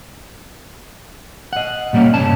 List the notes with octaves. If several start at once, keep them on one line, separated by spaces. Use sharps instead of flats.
D#5 F#5
A#2 G3 A#3 C#4 F5
C2 G2 C#4 A5